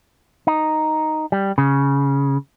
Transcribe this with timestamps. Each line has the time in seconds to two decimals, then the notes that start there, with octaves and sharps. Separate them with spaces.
0.47 D#4
1.32 G3
1.58 C#3